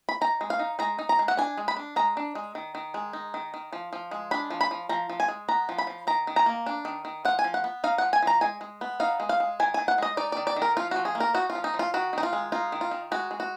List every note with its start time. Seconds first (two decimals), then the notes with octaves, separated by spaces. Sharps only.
0.09 B5
0.21 D#4 A#5
0.41 G#3
0.50 F5
0.59 D#4
0.79 G#3 A#5
0.99 D#4
1.09 A#5
1.19 G#3
1.28 F#5
1.37 D4 G#5
1.57 G#3
1.68 B5
1.77 D4
1.96 G#3 A#5
2.17 D4
2.35 G#3
2.55 D#3
2.75 D#3
2.94 G#3
3.13 D#4
3.34 D#3
3.54 D#3
3.73 F3
3.93 F3
4.11 G#3
4.31 D4 B5
4.50 F3
4.61 B5
4.71 F3
4.89 F3 A#5
5.09 F3
5.20 G#5
5.28 G#3
5.48 B3 A#5
5.69 F3
5.78 B5
5.87 F3
6.07 D#3 A#5
6.27 D#3
6.36 A#5
6.46 A#3
6.66 D4
6.85 D#3
7.05 D#3
7.25 F3 F#5
7.39 G#5
7.44 F3
7.54 F#5
7.64 B3
7.84 D#4 F5
7.98 F3 F#5
8.13 G#5
8.22 F3 A#5
8.41 G#3 G#5
8.61 G#3
8.81 B3
9.00 D#4 F5
9.20 G#3
9.29 F5
9.40 G#3
9.60 D#3 G#5
9.74 D#3 G#5
9.88 F#5
9.98 G#3 D#5
10.17 D#4 D5
10.32 D#3 D5
10.47 D5
10.56 D#3
10.62 A#4
10.77 F3 F4
10.91 F3 F#4
11.05 G#4
11.15 A#3
11.20 A#4
11.34 D#4 F#4
11.50 F4
11.55 F3
11.64 D#4
11.74 F3
11.79 F4
11.94 D#3 F#4
12.13 D#3 D#4
12.23 F4
12.33 G#3
12.52 D#4 F4
12.72 D#3
12.81 F4
12.91 D#3
13.12 G#3 F#4
13.31 G#3
13.40 F#4